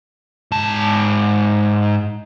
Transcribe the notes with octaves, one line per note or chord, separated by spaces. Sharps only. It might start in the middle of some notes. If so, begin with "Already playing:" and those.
G#2 A5